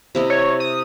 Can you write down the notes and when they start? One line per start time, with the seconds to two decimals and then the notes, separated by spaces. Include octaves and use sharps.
0.15 C3 E4 D#5
0.30 C#5
0.60 D#6